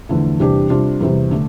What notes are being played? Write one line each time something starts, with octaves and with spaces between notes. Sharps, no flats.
E2 D3 F3 A3
E2 C3 G3 D4 G4
C3 G3 D4 F4
E2 C3 G3
D3 A3 D4